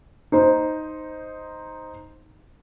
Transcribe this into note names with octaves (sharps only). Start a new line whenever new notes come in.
D#4 C5